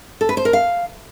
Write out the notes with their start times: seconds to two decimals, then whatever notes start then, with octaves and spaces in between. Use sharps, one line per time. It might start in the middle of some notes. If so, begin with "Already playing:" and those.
0.21 A4
0.29 B4
0.37 C5
0.45 A#4
0.53 F5